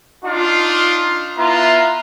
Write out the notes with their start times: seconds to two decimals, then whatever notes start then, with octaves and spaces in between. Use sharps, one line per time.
0.24 D4 D#4 F4
1.37 B3 E4 F4 A#5